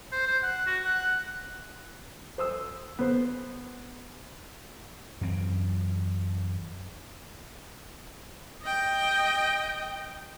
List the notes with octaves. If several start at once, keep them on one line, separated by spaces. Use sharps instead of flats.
C5
C5
F#5
F#4
F#5
C5 D#6 E6
B3 C5
F#2 E3 C4
D#5 G5